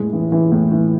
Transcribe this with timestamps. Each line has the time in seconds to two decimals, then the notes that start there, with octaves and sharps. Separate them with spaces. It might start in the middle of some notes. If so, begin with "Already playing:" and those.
Already playing: A2 G#3
0.13 E3
0.32 E3
0.52 A2
0.72 E3